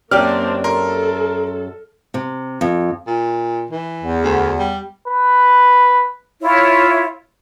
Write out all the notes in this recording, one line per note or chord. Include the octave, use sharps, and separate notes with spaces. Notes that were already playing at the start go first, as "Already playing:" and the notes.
F#2 A#3 C4 D4 G4 D5 F6
A4 A#4 C6
C3
F2
A#2
E3
E2
D2
G3
B4
E4 F4 C#5